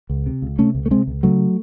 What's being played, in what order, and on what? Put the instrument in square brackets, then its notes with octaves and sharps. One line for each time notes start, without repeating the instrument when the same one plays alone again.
[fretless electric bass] C#2
C3
C#2
C3 A3 C#4
C#2
A3
C3 G#3 C4
C#2
C#3 F#3 A3